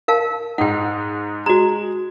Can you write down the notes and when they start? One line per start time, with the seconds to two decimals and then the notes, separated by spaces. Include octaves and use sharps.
0.08 A#4 F5 A5
0.58 G#2 D#4 F#5 G5
1.46 G#3 F#4 A#5